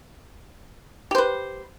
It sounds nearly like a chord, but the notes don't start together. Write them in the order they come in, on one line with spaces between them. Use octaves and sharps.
G4 C5 B4